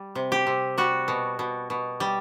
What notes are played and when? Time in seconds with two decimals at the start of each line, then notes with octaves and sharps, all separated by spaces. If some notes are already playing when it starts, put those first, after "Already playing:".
Already playing: G3
0.15 C3
0.32 G4
0.47 C3
0.78 G3 F#4
1.08 B2
1.39 B2
1.70 B2
2.00 G3